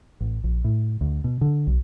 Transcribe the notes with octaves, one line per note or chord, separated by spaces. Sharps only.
A1
A#1
A2
D2
B2
D3
B1